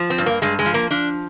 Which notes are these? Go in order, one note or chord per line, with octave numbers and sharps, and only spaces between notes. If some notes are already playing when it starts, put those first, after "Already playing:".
Already playing: F3
C4
G2
A#3
G2 G#3
G#3
F3
A#3
F3 D4